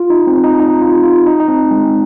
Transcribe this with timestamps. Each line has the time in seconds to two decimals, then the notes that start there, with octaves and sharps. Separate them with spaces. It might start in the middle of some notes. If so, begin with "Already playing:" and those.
Already playing: F4
0.10 D#4
0.27 C4
0.44 D#4
0.60 D#4
0.82 F4
1.04 F4
1.27 D#4
1.40 D#4
1.48 C4
1.71 G#3